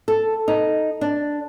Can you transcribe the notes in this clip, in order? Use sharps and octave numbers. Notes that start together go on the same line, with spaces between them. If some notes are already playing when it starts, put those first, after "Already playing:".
A4
D#4
D4